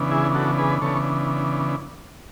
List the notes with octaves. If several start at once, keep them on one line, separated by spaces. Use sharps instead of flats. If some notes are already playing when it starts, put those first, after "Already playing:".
Already playing: C#3 E3 B3 D4
E4 G#4
F#4 A4
G#4 B4
C#3 E3 B3 D4 A4 C#5